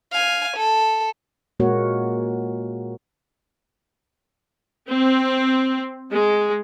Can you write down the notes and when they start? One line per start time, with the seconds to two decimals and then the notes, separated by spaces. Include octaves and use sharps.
0.13 F5 G#5
0.57 A4
1.60 A#2 G#3 A#3 F#4 A#4 C#5
4.88 C4
6.12 G#3